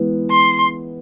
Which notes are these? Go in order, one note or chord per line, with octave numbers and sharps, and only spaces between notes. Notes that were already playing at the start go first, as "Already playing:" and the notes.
Already playing: E3 G#3 B3
C6